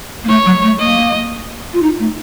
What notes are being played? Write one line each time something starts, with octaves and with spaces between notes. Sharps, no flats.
A#3
A3 C#5
F#3
A3
A#3 D#5
F4
D#4
A3